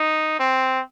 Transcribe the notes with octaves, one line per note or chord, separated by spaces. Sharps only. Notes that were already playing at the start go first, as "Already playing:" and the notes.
Already playing: D#4
C4